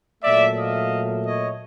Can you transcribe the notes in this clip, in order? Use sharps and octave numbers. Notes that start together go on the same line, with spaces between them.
A#2 F#3 A3 D5 E5
D#5 F5
C#5 D#5